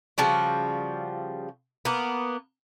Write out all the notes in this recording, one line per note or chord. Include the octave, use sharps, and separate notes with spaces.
C#3 F3 G3 F#4
A#3 B3